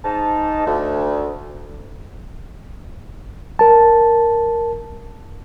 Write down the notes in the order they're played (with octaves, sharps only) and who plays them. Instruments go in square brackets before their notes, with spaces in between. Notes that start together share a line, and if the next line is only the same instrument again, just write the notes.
[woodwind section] G#2 D#4 A5
D2
[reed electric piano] A#4 A5